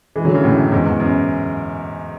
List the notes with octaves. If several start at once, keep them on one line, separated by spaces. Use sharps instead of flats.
E3 G#3
D3 F#3
C#3 E3
F#2 A2
F#2
E2 G#2
E2
F#2